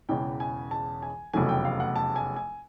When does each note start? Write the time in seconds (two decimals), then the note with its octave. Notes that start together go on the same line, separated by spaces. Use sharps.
0.09 E1 E2 C#3 E3 G5
0.40 G#5
0.71 A5
1.02 G#5
1.33 F1 E2 C#3 F#3 A3 G#5
1.49 G5
1.65 F5
1.80 F#5
1.96 A5
2.16 G#5
2.36 G#5